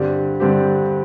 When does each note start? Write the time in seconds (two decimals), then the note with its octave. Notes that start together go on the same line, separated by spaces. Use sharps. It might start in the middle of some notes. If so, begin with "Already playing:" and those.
Already playing: G2 D3 G3 C4 G4
0.40 G2 D3 G3 C4 G4